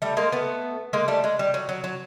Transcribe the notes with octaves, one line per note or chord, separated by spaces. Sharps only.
G3 A3
G#3 A#3
A3 B3
G#3 A#3
G3 A3
G#3
G3
F#3
F#3
F#3